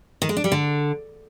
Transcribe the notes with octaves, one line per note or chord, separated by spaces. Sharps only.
D#3
G#3
D4
G3
D3